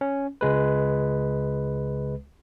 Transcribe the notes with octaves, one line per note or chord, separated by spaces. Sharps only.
C#4
C#2 G#3 B4